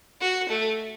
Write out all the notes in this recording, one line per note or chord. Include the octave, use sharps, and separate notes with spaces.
F#4
A3